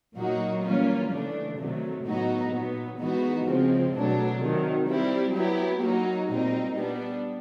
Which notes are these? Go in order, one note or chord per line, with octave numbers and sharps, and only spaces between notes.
A#2 F#3 A#3 D#4 F#4
E3 G3 A#3 C#4 F4
C#3 E3 A3 D4
C3 D#3 F#3 A3
A2 F#3 B3 D#4 F#4
A#2 F#3 B3
E3 G#3 B3 D#4 F#4
C#3 F3 G#3 C4
B2 F#3 A3 D4
C3 D#3 F#3
G3 C4 E4 G4
F#3 B3 E4 G4
F#3 A#3 D#4 F#4
A#2 G3 C4 D#4
G3 B3 D4